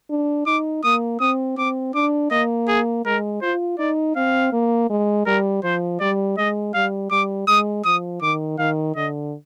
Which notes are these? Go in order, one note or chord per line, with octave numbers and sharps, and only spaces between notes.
D4
D#4 D6
A#3 D#6
C4 D#6
C4 D6
D4 D6
A#3 D#5
G#4
G#3 A#4
F4 C5
D#4 D5
C4 F5
A#3
G#3
G3 A#4
F3 C5
G3 D5
G#3 D#5
G3 F5
G3 D6
G#3 D#6
F3 D#6
D#3 D6
D#3 F5
D3 D#5